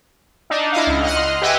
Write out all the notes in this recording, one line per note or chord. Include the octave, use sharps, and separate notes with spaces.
D4 D#4
E4 D#5 F5
C#2
D#5 F#5 F6
D#5 C6
G4 B4 D#5 E5 F#5 G#5